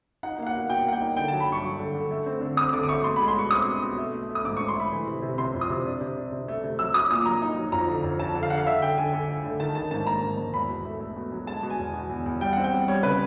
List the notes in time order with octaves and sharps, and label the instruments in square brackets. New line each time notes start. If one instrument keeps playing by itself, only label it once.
[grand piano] D#4 F#5
A#3 F5
F#5
B2
B2 G5
A#3 F#5
G5
D#4
D3 G5
F#3 A5
B5
G2 C#6
F#3
D3
D3
A3
C4
D3
C4 D#6
D3 D6
D6
A3 C#6
B2 C6
G#3 B5
C6
B2 C#6
C4 D#6
B2
B2
A3
A3
A3
D#6
G#2 D6
G#2 C#6
C6
A3 B5
E3
C3
C3
C3 C6
F2
D#6
C3
D4
C3
D4
C3
A3
C3
F#3 E6
F#3 D#6
A#2 D#6
F#3 A#5
D#4
F#3
F2 A#5
D3
F2
F2 A5
D3
F5
D3 F#5
F5
D3 E5
D3 G5
D3 G#5
D3
A3
D3
D#3 A5
D#3 A5
G#2 A5
A#3 A#5
G#2
G#2
E2 B5
B2
A3
A3
B2
F#3
G#3 A5
B2
G#5
E2
B2
E2
E2
G3 G5
C4 F#5
G5
G3
G3 C#5
C#3 B4